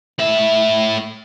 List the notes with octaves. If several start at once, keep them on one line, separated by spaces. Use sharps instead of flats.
A2 E5